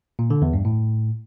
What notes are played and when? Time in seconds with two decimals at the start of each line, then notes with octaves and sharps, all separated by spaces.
0.19 A#2
0.30 D3
0.42 E2
0.53 G2
0.65 A2